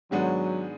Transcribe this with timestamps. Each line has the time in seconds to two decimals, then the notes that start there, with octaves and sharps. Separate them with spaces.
0.11 G#2 D#3 F#3 G#3 B3 D4